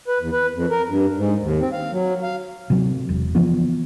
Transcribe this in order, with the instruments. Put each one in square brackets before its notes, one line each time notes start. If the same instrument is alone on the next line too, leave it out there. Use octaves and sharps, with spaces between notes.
[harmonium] B4
E2
B4
F2
A#4
G2
G#2
D#2
C4
F5
F#3
F5
[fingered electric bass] C3 F#3
E1
C#3 E3 F3 B3